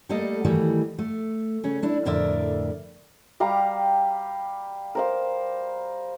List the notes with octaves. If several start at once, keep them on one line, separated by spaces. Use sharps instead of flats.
G3 A3 A#3 A4 D#5
D#3 E3 F#3 G3 A3
A3
C#3 C#4
A3 D4 E4
F2 A2 D3 A#4 D5 E5
G3 G4 F5 A#5
A#4 C5 F5